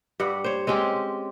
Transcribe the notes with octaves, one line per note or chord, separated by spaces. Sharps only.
G2 G3 F#5
C5 C#5
G#3 C4 C#4 G4